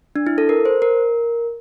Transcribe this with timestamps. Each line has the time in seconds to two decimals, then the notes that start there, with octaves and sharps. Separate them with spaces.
0.16 D4
0.27 E4
0.38 A4
0.49 A#4
0.65 C5
0.82 A#4